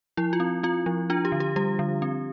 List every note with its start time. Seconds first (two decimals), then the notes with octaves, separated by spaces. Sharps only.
0.17 F3 E4
0.33 F4
0.40 C4
0.63 C4 F4
0.86 F3
1.10 D4 F4
1.25 G4
1.32 D3
1.40 G4
1.56 G3 G4
1.79 D3
2.02 C4